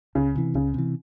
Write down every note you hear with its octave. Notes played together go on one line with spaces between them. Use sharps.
C#2 C#3
C3 E3
C#2 C#3
C3 E3